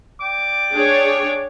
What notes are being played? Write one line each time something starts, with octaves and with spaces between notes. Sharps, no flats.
D5 G5 D6
D4 G#4 C#5